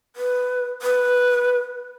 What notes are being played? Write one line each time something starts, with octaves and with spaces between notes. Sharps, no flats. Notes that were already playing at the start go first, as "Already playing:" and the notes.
B4
B4